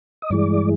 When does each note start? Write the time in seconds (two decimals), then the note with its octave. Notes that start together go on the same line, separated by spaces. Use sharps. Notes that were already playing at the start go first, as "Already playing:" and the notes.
0.22 D#5
0.30 G2 E3 G#3 D5